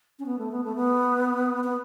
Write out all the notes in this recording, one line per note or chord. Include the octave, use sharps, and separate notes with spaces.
C#4
B3
A3
B3
A3
B3
B3